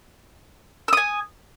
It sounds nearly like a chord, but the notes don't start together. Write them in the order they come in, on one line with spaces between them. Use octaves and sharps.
E6 D#6 G#5